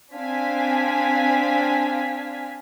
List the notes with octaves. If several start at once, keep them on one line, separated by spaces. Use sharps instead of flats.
C4 D4 F5 G#5 B6